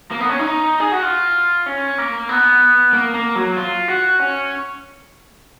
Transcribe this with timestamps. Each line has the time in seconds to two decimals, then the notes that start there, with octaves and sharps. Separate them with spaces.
0.11 A#3
0.20 B3
0.29 C#4
0.39 D#4
0.80 G#4
0.92 F#4
1.03 F4
1.66 C#4
1.98 A#3
2.29 B3
2.93 A#3
3.14 A#3
3.36 F#3
3.57 F4
3.88 F#4
4.20 C#4